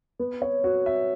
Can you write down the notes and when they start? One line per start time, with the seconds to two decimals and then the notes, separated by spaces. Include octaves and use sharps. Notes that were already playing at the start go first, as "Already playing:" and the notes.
0.19 B3
0.42 C#5
0.64 F#4
0.86 E5